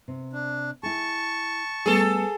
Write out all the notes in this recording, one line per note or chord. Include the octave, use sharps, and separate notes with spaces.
C3
D4
E4 G#4 A5 C#6
G3 A3 B3 G#4 A4